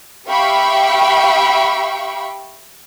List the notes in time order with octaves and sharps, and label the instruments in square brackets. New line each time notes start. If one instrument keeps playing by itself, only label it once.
[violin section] G4 E5 F5 G5 B5 C#6